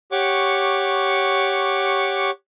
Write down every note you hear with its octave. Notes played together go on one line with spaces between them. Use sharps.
G4 C#5 F#5 C#6 D6